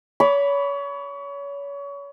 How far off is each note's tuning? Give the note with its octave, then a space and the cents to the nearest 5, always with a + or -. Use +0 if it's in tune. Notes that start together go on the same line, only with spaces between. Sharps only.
C#5 +30 B5 +0 D6 -5